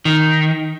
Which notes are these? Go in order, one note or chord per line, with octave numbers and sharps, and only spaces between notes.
D#3